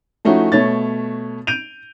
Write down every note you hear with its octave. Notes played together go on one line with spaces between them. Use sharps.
F3 A3 C#4 D#4 E4 F#4
B2 A3 C#5 A6
G6 D7 D#7 F7